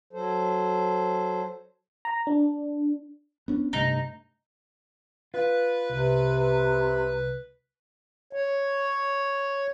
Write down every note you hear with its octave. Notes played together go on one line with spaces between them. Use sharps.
F#3 A4 C5
A#5
D4
B3 C#4 D4
G2 C3 A3 D#4
F4 B4
C2 C3
C#5